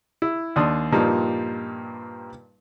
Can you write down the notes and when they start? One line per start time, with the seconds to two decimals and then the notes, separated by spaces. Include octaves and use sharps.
0.22 E4
0.56 D#2 D4 C6 D#6
0.92 G2 A#2 F3 G3 A#3 D#4